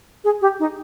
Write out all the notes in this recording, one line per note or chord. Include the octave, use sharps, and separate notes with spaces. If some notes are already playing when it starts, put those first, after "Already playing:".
G#4
G4
D#4